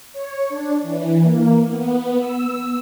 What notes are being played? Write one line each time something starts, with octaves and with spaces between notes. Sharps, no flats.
C#5
D4
E3
A#3
B3
E6